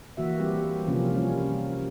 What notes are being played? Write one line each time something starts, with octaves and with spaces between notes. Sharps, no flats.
E3 A#3 F#4 E5
G3 C4 G4
C3 F3 A#3 C#4
F3 G3 C#4